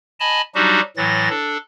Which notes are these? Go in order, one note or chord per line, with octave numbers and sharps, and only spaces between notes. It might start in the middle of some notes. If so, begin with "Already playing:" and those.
D#5 G#5 A5 B5
F#3 G3 D4 D#4 F#4 G4
A2 E3 F#3 A6 A#6
D4 A4